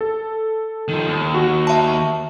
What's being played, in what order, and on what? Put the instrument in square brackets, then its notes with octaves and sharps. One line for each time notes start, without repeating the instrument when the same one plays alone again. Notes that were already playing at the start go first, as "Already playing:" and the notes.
[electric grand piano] A4
[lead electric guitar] D#3 F3
D#2
[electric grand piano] F#4
[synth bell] E5 A5